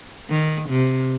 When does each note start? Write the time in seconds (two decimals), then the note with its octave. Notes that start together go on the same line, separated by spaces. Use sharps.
0.30 D#3
0.70 C3